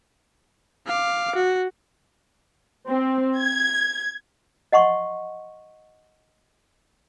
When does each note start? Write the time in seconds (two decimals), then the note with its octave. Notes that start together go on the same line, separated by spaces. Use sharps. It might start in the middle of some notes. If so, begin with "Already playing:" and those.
0.87 F5 D6
1.35 F#4
2.87 C4
3.36 G#6
4.72 D#5 F#5 C6 C#6